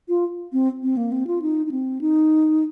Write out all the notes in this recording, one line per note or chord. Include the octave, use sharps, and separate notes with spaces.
F4
C4
C4
A#3
C4
F4
D#4
D#4
C4
D#4